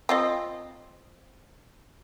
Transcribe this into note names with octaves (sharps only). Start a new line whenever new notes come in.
C4 F4 D#5